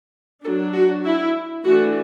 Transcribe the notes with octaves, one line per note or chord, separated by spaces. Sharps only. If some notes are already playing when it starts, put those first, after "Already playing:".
F#3 D4 A4
F#4
E4
E3 A3 D4 F#4